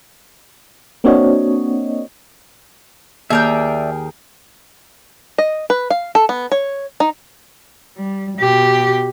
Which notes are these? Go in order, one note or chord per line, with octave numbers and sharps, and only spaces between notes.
A#3 C4 D4 F#4 C#5 D#5
D#2 G#4 A#4 D5 E5 G5
D#5
B4
F5
A4
B3
C#5
D#4
G3
B2 G4